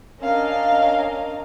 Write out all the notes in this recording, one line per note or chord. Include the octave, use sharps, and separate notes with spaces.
C#4 D4 A#4 D#5 F5